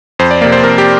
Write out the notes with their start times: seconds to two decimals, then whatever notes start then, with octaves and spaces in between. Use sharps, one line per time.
0.19 F2 C5
0.31 D5
0.41 A#3 D5
0.45 C3
0.52 C5
0.63 F2 A#4
0.78 G4